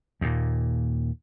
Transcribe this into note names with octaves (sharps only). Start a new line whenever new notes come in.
D#2 A#2